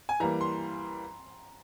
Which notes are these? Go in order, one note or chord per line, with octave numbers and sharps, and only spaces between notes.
G#5
E3 G3 A#3 A#5
C6